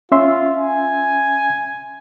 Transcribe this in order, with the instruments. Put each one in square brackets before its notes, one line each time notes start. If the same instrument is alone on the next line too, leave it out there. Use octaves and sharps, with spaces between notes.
[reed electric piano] C#4 E5 C6 [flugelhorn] F4
[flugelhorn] G#5